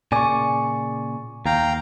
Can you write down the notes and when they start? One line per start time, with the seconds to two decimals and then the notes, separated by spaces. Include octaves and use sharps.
0.12 A#2 C#3 D5 G#5 C#6
1.46 D#2 F5 G5 A#5